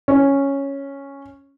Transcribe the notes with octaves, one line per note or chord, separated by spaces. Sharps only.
C#4